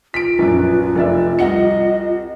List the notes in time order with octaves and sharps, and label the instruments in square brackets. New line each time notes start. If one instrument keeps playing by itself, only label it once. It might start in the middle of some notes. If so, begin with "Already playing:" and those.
[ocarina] F4 [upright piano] B6 D7
[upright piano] A#1 F#2 [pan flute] B4
[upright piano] F1 D5 E5
[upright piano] C2 F#5 C#7 [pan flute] D#5